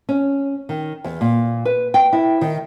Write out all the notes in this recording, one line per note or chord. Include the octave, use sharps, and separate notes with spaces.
C#4
D#3
E2
A#2
B4
G5
E4
D#3